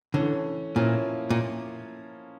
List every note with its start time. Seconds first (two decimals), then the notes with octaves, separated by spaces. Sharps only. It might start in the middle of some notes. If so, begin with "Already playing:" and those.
0.14 D3 E3 A3 C#4
0.76 A#2 F3 A#3 C#4 E4
1.30 A#2